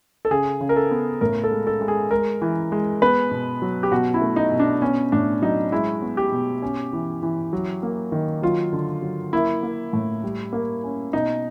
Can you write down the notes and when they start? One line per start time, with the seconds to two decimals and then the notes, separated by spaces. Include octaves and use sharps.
0.25 A4
0.31 C#3 G#4
0.61 C#3
0.69 A#4
0.76 A4
0.91 B3
1.21 A2 A#4
1.44 A4
1.51 G#3
1.67 A4
1.81 G#3
1.88 G#4
2.11 G#3 A#4
2.42 E3
2.72 G#3
3.02 B3 B4
3.31 B2
3.62 F#3
3.83 G4
3.92 B2 F#4
4.14 E4
4.22 A3
4.36 D#4
4.52 B2
4.59 D4
4.82 B3 C#4
5.12 A2 D4
5.42 F#3 D#4
5.72 G#3 E4
6.02 B3
6.17 G4
6.32 B2
6.62 C#4
6.93 E3
7.23 E3
7.53 F#3
7.83 A#3
8.12 D#3
8.42 F#3 F4
8.73 D3
9.02 F#3
9.33 A#3 E4
9.63 A#3
9.93 A2
10.24 G3
10.53 A#3
10.84 C#4
11.13 B2 D#4